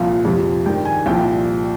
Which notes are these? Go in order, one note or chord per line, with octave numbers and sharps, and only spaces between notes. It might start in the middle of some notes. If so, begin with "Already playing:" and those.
Already playing: C2 A#2 F3 F5
F2 C3 F3
G2 D#3 G5
G#5
C2 A#2 F3 G5